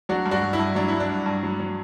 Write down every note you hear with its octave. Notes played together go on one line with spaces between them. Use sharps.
F#3 D4 F#4
G2
D4 F#4
G2
E4
G2
F#3 D4
G2 E4
D4
G2
G2
F#3
F#3